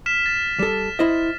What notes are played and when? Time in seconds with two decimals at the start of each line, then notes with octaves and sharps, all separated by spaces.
0.06 F6 B6 E7
0.26 A6
0.59 G3 A4 E7
0.99 E4 C5 D#5